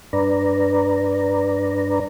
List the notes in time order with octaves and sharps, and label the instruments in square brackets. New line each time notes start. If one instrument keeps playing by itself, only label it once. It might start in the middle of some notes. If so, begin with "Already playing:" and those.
[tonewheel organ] G2 D4 B4 D5 A#5